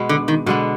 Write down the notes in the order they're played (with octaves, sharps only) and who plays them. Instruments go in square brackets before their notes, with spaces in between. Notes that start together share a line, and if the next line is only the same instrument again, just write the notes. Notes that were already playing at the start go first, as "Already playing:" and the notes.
Already playing: [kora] B2 G#3 B3
[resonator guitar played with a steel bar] D3
D#3
[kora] B2 G#3 B3 [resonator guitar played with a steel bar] D3